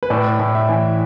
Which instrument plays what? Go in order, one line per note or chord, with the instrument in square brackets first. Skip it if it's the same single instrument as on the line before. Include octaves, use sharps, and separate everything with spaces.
[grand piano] B4
A2 D5
A2
E5
E3